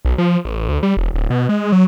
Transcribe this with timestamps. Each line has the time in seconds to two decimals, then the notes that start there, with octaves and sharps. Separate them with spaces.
0.05 B1
0.18 F3
0.45 A1
0.69 D2
0.83 G3
0.97 E1
1.14 D1
1.30 B2
1.49 G#3
1.72 F#3